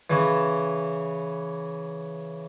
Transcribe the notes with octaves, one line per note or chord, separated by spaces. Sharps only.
C#3 E3